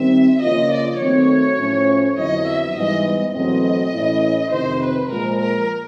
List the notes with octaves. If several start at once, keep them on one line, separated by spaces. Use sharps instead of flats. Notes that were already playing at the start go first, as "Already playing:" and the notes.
Already playing: D#3 G3 C4 E5
C#3 F3 A#3 D4 F4 D#5
D5
D#3 F#3 A3 C4 C#5
A2 F3 A3 C#4
F2 D3 F#3 B3 E4 D#5
E5
G#2 E3 G3 B3 D#5
D#5
E2 B2 F#3 A3 C4 D#5
A2 E3 A3 C#4 E4
F2 C3 D#3 C5
B4
A#2 F3 G#3 A#4
A#4